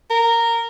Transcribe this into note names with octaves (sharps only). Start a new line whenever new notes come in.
A#4